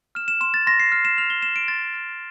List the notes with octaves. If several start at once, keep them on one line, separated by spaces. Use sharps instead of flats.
F6 E7
E7
C6 E7
A6
C6 A#6
C7
F6 C7
E7
F6 F7
G7
C6 E7
D7
C6 A6
F6